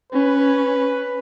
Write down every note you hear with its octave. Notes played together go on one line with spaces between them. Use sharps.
C#4 B4